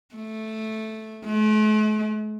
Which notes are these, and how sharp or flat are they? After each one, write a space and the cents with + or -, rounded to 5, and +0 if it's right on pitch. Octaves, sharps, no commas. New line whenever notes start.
A3 -5
A3 -45